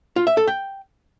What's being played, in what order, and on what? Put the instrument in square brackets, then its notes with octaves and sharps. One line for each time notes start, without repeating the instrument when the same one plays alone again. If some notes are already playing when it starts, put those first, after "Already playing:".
[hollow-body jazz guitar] F4
E5
A4
G5